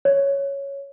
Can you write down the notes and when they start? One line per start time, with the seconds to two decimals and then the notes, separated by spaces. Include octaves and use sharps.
0.05 C#5